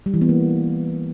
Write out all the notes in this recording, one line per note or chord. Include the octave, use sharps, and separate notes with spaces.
G3
E3
B3
A#3